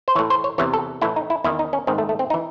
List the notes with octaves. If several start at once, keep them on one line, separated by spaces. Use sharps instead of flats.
C5
A2 E3 C#5
C5
C#5
E2 C3 E3 C#5
A4
A2 E3 E4
D#4
E4
E2 D#3 E4
D#4
C#4
G#2 D#3 C4
A3
A3
C4
D#4
E3